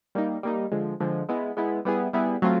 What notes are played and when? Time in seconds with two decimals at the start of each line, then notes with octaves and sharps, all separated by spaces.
0.15 G3 A#3 D#4
0.43 G3 A#3 D#4
0.72 D3 F3 G#3
1.00 D3 F3 G#3
1.29 G#3 B3 E4
1.57 G#3 B3 E4
1.85 G3 B3 E4 G#4
2.13 G3 B3 E4 G#4
2.42 F#3 A3 C4 F4